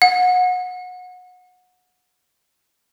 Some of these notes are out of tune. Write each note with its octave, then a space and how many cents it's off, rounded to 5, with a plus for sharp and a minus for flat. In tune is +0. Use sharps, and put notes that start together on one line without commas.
F#5 -25